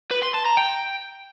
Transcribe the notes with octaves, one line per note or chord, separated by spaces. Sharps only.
B4
C6
A5
A#5
G5